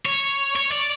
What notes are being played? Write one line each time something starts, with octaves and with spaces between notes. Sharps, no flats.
C#5
C#5
D5